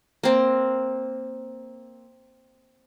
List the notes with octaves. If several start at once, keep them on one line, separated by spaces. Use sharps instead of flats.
A#3 C4